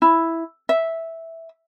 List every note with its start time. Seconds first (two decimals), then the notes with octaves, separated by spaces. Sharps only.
0.02 E4
0.69 E5